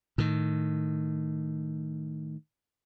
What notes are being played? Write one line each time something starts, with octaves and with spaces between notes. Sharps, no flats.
A2 D#3